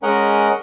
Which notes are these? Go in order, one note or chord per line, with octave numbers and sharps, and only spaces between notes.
G#3 C#4 A#4 D#5 F#5